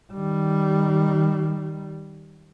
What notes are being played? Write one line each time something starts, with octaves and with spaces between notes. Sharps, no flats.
D#3 G3